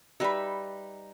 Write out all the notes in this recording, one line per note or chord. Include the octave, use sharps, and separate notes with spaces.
G3 D#4 B4 E5 B5